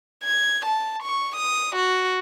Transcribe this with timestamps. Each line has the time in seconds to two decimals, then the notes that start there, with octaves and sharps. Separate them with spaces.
0.24 G#6
0.66 A5
1.03 C#6
1.36 D#6
1.76 F#4